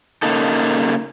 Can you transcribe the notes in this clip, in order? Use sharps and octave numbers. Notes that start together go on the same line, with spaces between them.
C#3 A#3 D#4 A4